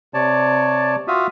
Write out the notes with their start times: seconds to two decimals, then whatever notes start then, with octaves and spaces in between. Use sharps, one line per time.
0.14 C3 C#5 D5 A5
1.08 F4 F#4 E5 F5 D#6